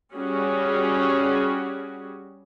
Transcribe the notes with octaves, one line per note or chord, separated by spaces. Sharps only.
G3 C#4 F#4 G#4